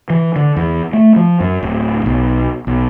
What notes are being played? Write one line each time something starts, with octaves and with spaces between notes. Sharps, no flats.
E3
D3
E2
A3
F3
F#2
D1
B1
B1